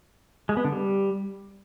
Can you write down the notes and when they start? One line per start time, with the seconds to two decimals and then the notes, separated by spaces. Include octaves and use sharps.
0.49 G#3
0.57 B3
0.65 D3
0.72 G3